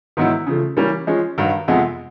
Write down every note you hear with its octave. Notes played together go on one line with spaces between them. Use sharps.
G#2 D#3 F#3 B3 E4
C#3 F3 A3
E3 G3 A#3 C#4
F3 G#3 C#4
G2 D#3 F#3
F2 C3 F3 G#3 B3